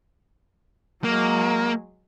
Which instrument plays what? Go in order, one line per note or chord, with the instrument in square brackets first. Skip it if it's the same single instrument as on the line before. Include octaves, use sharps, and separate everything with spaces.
[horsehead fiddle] F#3 G#3 [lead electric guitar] A#3